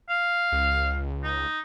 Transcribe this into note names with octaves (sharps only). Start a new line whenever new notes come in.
F5
C#2
D#4